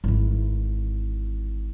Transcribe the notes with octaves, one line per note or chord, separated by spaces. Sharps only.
G#1 E3